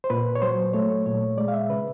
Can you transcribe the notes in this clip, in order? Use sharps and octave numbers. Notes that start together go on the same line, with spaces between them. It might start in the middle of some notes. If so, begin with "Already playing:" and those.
C5
A#2 B4
C#5
F#3 C5
A3 C#5
A#2 C#5
G#3 D5
F5
E5
C#3 B4